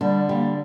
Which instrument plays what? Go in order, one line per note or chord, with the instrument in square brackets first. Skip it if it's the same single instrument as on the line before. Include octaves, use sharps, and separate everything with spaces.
[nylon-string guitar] D3 [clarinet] G3
[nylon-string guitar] G3 [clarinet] A#3